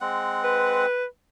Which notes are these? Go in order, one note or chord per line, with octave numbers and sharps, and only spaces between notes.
G#3 C4 F#5
B4